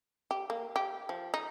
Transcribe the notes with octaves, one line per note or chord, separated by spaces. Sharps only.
G4
A#3
G4
F3
D#4